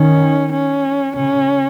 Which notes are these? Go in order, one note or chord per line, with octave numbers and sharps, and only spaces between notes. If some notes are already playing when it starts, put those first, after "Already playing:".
Already playing: D#3 C#4
C#4
C#3 C#4